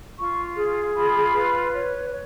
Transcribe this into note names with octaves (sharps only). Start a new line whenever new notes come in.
F4 C#6
G#4
F4 B5
B4
C#5
C#5